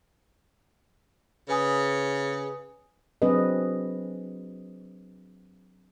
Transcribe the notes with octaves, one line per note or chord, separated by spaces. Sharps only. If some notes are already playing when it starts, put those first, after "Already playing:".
C#3 B4 G#5 D#6
F#3 C4 D4 G#4 B4 D#5